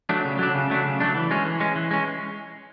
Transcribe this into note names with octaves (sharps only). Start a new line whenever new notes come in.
F#3 A3 D4
C#3
F#3 A3 D4
C#3
F#3 A3 D4
C#3
F#3 A3 D4
E3
G#3 C#4
E3
G#3 C#4
E3
G#3 C#4